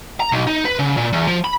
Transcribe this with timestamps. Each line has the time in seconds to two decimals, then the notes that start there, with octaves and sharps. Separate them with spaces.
0.20 A#5
0.32 B1
0.47 D#4
0.65 B4
0.79 C#3
0.97 A#2
1.13 E2
1.27 F3
1.44 B5